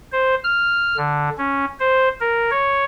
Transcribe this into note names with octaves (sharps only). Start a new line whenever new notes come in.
C5
F6
D3
C#4
C5
A#4
C#5